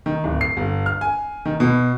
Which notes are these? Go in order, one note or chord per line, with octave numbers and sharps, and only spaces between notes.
D#3
D1
C7
G1
F6
G#5
D#3
B2